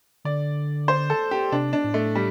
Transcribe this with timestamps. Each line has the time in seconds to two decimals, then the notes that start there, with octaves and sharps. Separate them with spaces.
0.25 D3 D5
0.88 C5
1.10 A4
1.31 G4
1.52 C3 D4
1.73 D4
1.84 A2
1.94 A3
2.15 G3